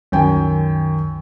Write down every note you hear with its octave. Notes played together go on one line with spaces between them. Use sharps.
C2 F#2 D#3 G5 G#5